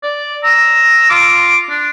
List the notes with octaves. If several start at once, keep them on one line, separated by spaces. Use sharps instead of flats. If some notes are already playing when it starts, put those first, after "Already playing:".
D5
A#5 E6
F4 D6
D4